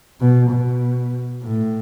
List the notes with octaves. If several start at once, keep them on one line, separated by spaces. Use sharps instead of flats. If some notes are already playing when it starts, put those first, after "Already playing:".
B2
B2
A2